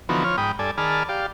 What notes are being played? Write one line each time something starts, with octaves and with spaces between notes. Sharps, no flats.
D3 E3 F3 B3 D#4 F#4
F3 C#5 F6
G#2 G5 B5 D#6
G2 A4 D5 G#5
D#3 G#4 D5 A5 B5 F6
G4 D5 F5